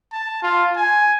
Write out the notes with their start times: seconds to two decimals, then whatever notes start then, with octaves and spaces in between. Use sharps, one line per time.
0.13 A5
0.42 F4
0.77 G#5